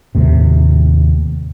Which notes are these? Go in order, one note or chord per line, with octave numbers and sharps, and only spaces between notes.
D#2 A2 C3